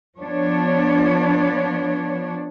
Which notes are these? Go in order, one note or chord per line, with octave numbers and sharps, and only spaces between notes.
F3 B3 D4 C#5